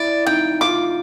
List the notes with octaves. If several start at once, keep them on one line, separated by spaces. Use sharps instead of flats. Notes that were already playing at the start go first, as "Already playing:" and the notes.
Already playing: E4 D5
D#4 G5
F4 D6